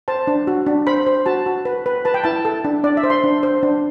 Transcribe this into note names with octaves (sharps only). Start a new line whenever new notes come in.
C5 A5
D4
F#4
D4
C5 B5
C5
F#4 A5
F#4
B4
B4
B4 A5
G5
E4 A5
A4
D4
D4 D5
E5
C5
C6
D4
C5
D4